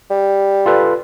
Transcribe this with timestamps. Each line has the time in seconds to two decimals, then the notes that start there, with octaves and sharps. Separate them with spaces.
0.10 G3
0.66 F4 A4 B4